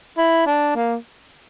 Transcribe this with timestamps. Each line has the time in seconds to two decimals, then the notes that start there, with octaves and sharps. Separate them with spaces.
0.18 E4
0.47 D4
0.76 A#3